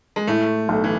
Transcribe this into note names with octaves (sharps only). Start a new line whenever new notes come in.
G#3
A2 A3
B1
E3